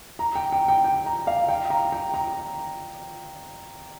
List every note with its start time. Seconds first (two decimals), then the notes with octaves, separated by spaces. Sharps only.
0.19 A#5
0.35 G5
0.52 G5
0.68 G5
0.84 G5
1.06 A#5
1.27 F5
1.48 G5
1.70 A#5
1.92 G5
2.14 A#5